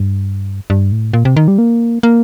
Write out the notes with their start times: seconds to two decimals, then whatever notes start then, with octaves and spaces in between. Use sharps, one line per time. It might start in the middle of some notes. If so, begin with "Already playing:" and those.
Already playing: G2
0.70 G2
0.92 A2
1.13 A#2
1.25 C3
1.37 D#3
1.48 G3
1.58 A#3
2.03 A#3